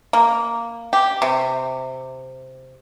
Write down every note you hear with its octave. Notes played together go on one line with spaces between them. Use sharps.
A#3
G4
C3